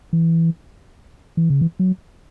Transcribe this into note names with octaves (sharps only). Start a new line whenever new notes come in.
E3
E3
C#3
E3
F#3